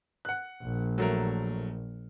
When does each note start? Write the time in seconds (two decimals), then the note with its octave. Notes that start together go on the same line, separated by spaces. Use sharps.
0.25 F#5 F#6
0.63 A#1
0.98 F#3 A3 A#4